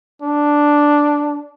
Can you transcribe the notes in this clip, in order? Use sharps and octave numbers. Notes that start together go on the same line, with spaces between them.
D4